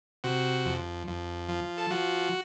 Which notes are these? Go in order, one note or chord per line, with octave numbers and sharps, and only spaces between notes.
C3 F#4
F2
F2
F3
A4
F3 F#4